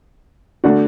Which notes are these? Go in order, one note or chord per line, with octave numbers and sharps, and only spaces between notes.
D3 A3 D4 F#4